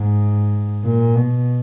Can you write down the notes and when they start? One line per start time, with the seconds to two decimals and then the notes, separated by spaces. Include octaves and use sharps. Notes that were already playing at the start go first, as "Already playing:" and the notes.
Already playing: G#2
0.84 A#2
1.15 B2